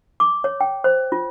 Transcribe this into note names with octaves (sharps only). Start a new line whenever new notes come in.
D6
C#5
G5
C5
F4